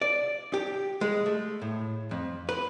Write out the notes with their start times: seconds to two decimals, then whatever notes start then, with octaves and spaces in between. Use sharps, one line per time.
0.02 D5
0.54 G4
1.01 G#3
1.26 A3
1.62 A2
2.11 F2
2.49 B4